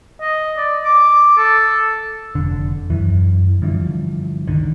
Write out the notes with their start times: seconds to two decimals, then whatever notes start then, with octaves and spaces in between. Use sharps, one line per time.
0.21 D#5
0.57 D5
0.85 D6
1.38 A4
2.35 F1 D3
2.90 F#2 E3
3.62 G2 D3 E3 F3
4.47 C#2 D3 D#3